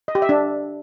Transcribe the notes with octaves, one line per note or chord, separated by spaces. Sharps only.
D#5
G4
E5
D4